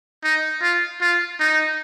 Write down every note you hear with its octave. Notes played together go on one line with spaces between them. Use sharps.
D#4
F4
F4
D#4